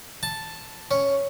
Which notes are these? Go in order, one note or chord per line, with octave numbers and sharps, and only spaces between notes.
A5
C#4